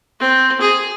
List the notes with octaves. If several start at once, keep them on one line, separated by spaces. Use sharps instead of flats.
C4
G#4